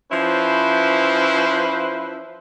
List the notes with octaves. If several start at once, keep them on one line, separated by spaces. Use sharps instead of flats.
F3 C#4 E4 B4 C5